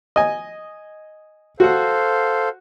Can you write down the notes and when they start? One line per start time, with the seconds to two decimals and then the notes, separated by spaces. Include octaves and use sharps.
0.16 D#5 G#5
1.60 F#4 A4 C5 F5 F#5